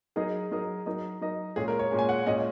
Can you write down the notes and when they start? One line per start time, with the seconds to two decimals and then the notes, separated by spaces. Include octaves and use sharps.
0.16 F#3 D#4 G#4 A#4 D#5
0.51 F#3 D#4 A#4 D#5
0.86 F#3 D#4 A#4 D#5
1.21 F#3 D#4 A#4 D#5
1.56 A#2 G#3 C#4 G#4
1.68 A#4
1.79 C#5
1.91 A#2 G#3 C#4
1.99 G#5
2.09 F#5
2.26 A#2 G#3 C#4 D#5